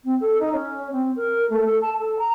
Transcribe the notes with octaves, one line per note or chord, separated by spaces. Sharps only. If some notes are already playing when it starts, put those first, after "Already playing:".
C4
A4
D#4
C#4
C4
A#4
A3
A4
A5
A4
A#5